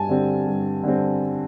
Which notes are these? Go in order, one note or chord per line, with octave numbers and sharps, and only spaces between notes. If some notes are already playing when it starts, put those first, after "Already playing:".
Already playing: G2 G#5 A5
D3 G3 C4
G2
D3 G3 C4